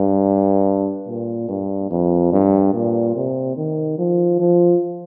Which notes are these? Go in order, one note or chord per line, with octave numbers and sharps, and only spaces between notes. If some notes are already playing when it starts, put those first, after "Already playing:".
Already playing: G2
A#2
G2
F2
G2
A#2
C3
D#3
F3
F3